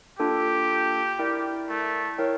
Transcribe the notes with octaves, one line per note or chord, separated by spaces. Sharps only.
A#3 D4 F4 G4 A4
E4 A#4 D5 G5
A3
E4 A#4 C#5 G5